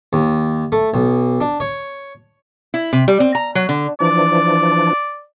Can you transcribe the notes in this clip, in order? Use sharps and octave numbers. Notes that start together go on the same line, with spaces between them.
D#2
A3
B1
D4
C#5
E4
C3
G3
C4
A#5
F#3
D3
E3 F3 D4 D5